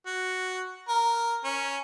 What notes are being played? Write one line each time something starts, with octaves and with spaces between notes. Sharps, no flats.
F#4
A#4
C#4